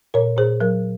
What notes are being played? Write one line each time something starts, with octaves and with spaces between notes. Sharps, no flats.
A#2 A#4 C#5
A#2 G#4 C5
F#3 A#4